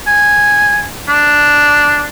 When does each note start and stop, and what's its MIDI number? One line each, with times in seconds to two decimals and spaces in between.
0.07 0.84 80
1.09 2.08 62